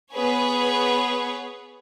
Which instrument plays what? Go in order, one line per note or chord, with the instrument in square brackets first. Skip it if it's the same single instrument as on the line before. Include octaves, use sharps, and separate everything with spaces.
[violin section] B3 G#4 B4 C#5